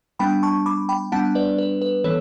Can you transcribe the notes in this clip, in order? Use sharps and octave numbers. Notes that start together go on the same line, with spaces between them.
G3 B3 D4 G5 B5
A5 C#6
B5 D6
G5 B5
G3 B3 D4 F#5 A5
B4 D5
B4
B4
E3 B3 A4 C#5